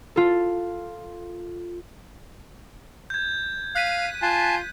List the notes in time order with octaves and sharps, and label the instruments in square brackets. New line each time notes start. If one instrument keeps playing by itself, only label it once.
[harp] F4 A4
[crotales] G6 G#6
[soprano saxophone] F5 [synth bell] F#6 B6 D#7
[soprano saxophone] F4 [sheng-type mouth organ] G#5 A5